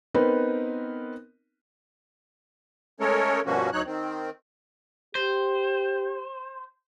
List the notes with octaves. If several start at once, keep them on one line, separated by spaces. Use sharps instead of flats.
B3 C4 D#4 A#4 B4
G#3 A3 C#4 A4 A#4 C#5
G2 B2 F3 A#3 C#4 F#4
D2 F#3 D#4 C#5 F#6
D#3 C4
G4 C5